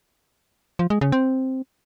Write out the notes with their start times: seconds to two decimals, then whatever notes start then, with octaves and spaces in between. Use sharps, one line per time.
0.79 F3
0.90 G#3
1.01 C#3
1.12 C4